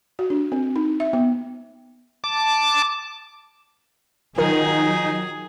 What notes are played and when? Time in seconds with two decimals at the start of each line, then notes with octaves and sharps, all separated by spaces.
0.19 F#4
0.30 D4
0.52 C4
0.76 D#4
1.00 E5
1.13 B3
2.24 A5 D6
4.38 D#3 F#3 D#4 F4 G#4 A#4